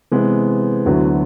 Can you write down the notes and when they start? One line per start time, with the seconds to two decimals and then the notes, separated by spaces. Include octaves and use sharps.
0.11 C3 E3 G#3 B3
0.86 D2 D3 F#3 B3 E4